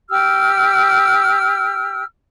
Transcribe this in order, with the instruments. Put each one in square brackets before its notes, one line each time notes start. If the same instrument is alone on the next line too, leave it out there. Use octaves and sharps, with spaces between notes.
[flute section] G4 E6 F6